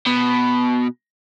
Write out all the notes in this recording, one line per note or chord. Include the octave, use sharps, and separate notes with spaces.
B2